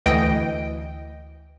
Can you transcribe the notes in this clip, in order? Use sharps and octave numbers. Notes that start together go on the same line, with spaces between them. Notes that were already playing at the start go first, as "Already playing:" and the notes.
D2 E3 D#5 G5 D7